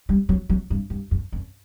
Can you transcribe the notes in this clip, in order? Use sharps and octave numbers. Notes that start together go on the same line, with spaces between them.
G3
F#3
F#3
G2
G2
F#2
F#2